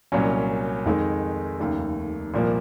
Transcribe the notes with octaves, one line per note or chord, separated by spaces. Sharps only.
C2 A#2 F#3 C#4
F2 D#3 G#3 D#4
F1 D#2 C#3
C2 A#2 F3 A#3